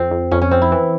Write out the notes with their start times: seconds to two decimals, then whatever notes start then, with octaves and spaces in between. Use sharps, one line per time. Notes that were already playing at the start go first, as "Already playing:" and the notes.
Already playing: F2 C4
0.11 F2
0.31 F2 C#4
0.42 C#4
0.51 F2 C4
0.62 E4
0.72 E3